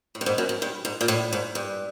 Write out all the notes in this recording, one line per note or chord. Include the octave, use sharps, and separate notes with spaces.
A2
G2
G#2
F#2
F#2
G2
G#2
A#2
A2
G#2
G2